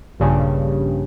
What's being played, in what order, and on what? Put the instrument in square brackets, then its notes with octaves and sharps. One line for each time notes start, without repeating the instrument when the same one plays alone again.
[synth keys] A#1 G2 C#3